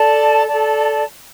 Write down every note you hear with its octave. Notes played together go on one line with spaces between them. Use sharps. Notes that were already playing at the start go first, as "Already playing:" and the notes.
Already playing: A4 D5 A5
A4 D5 A5